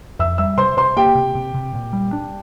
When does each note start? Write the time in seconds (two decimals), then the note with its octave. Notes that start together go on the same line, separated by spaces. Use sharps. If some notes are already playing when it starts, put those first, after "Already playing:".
0.19 F2 E5 E6
0.38 G3 E5 E6
0.57 C3 C5 C6
0.77 C3 C5 C6
0.97 A#3 G4 G5
1.15 C3
1.35 C3
1.54 C3
1.74 A#2
1.93 G3
2.13 D4